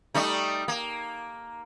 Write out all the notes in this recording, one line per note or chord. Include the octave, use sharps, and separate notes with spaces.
G3 A3 D#4
A#3